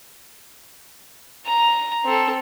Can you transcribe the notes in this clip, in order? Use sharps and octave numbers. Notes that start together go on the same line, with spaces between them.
A#5
C4 A4